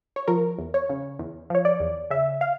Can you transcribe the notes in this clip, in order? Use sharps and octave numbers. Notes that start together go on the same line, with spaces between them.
C#5
F3 A#4
E2
C#5
C#3
E2
F3 C#5
D5
E2
C#3 E5
F5